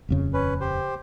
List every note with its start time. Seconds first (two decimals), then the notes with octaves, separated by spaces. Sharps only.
0.09 D#1 F2 C#3
0.33 C#4 B4
0.61 G4 C5